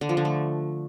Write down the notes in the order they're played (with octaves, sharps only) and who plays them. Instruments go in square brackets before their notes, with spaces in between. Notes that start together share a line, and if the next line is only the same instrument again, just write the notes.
[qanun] D3
F3
D3
A3